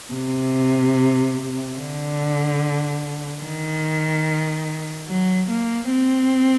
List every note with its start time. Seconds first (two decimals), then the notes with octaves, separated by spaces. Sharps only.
0.13 C3
1.78 D3
3.43 D#3
5.09 F#3
5.49 A#3
5.91 C4